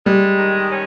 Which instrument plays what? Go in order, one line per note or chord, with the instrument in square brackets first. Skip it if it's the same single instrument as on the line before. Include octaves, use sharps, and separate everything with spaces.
[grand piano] G3 [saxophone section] G#3
[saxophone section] D#3
C#4